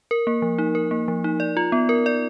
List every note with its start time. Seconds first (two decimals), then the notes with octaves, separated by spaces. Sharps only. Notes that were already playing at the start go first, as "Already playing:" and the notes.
0.11 A#4
0.27 A#3
0.42 F3
0.58 D#4
0.75 A#4
0.91 A#3
1.08 F3
1.24 D#4
1.40 D5
1.57 F4
1.72 B3
1.89 A#4
2.06 D5